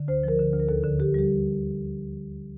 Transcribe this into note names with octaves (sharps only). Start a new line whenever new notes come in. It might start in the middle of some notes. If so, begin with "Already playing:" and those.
Already playing: D3
D2 C5
F3 A#4
D3
D2
A#4
D#2 A4
D3
D3 G4
G3 G4